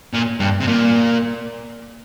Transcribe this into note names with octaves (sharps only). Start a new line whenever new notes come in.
A#2
G2
C3
A#2